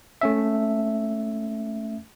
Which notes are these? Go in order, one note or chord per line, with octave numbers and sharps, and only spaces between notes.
A3 C#4 E5